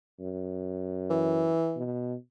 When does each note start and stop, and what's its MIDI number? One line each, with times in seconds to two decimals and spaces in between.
0.20 1.55 42
1.10 1.81 52
1.77 2.15 47